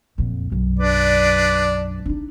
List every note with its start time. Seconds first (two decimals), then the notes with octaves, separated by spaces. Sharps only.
0.18 F2 A#2
0.52 B1 F#2
0.79 D4 B4 D5
2.06 D4 D#4